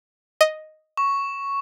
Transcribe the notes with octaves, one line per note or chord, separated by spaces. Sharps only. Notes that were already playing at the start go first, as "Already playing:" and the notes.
D#5
C#6